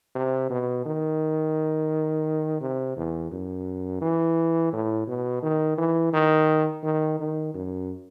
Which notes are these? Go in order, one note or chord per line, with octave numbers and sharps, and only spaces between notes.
C3
B2
D#3
C3
E2
F#2
E3
A2
B2
D#3
E3
D#3
D#3
D#3
F#2